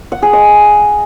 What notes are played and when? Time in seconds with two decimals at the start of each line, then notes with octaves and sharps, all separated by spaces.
0.12 F#5
0.22 G#4
0.33 D#5